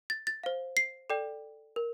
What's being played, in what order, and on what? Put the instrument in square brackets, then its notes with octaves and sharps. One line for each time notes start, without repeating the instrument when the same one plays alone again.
[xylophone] A6
A6
C5 F5
C7
A4 D5 G5
A#4